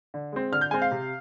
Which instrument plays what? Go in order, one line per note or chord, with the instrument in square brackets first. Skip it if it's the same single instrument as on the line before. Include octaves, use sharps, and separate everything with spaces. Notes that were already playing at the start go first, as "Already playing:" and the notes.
[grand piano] D3
G#3 C4
D3 F6
G6
G#3 C4 G#5
F5
C3